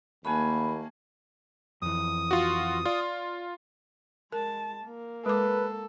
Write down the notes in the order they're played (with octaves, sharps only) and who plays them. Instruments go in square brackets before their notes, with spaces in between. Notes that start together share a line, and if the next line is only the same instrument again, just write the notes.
[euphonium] D#2 [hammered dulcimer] A3 F#5 G#5 [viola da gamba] A#3 [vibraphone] B5
[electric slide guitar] F2 E3 [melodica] D#6
[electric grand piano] F4 F#4
[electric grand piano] F4 [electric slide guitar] D5
[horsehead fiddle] G#3 A5 [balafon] A#4
[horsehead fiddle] A#3
[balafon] G#3 D6 [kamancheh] A4 [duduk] B4